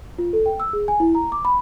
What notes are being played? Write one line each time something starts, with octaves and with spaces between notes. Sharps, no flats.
F4
A4
G5
E6
G#4
G#5
E4
A#5
D6
B5